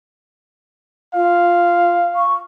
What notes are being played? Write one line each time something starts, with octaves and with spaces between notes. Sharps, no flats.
F4 F5
C#6